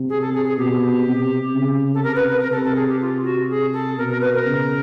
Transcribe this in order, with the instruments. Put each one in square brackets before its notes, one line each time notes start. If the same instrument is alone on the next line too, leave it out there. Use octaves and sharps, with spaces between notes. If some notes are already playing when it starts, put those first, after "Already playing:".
Already playing: [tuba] C3
[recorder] G#4
A4
G#4
G#4
[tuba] B2 [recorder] G4
[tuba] C3
C#3
[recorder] A4
[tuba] C3 [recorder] A#4
[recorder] B4
B4
A#4
[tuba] C3 [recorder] A4
[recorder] A4
G#4
G4
F4
F#4
G#4
A4
[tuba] B2 [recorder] A#4
[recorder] A#4
B4
A#4
[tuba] C#3